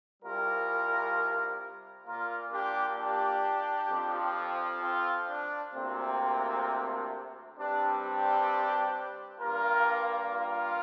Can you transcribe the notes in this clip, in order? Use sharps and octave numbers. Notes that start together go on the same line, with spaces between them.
C2 C3 G3 F4 A#4
A#2 A#3 F4 A#4
D4 G4
D4 G4
F2 F3 C4
C4 F4
D4
D2 C3 A#3 C4
G2 G3 C4 D4
D4 G4
G2 G3 A#3 F4 A#4
F4 A#4